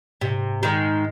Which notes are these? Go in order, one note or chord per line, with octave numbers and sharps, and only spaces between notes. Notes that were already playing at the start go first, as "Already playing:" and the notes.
G#2 C3
D#3 G#3